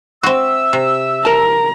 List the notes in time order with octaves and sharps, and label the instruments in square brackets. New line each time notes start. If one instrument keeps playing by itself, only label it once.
[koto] C4 F#4 [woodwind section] E5 E6
[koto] C3
[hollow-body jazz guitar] A#4 A5 [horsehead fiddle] A#5